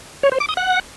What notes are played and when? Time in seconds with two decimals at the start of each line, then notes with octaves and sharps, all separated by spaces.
0.23 C#5
0.32 C5
0.40 D6
0.49 D#6
0.57 F#5